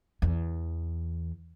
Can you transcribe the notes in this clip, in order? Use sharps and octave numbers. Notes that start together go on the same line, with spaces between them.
E2